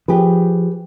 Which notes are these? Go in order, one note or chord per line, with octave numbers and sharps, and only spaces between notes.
F3 G4 G#4 B4